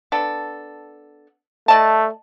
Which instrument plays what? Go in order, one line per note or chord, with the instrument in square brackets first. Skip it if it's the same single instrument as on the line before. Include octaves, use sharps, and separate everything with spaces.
[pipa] B3 D4 A4
[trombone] A3 [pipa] D5 D#5 A5